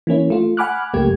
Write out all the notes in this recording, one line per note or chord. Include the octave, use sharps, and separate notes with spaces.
E3 A#3 C#4 E4
A3 F4
F#5 G#5 B5 D6 F6 F#6
C#2 F#2 A3 A#3 G4 G#6